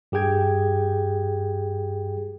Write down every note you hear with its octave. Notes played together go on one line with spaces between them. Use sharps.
G2 G4 G#4 G5 G#6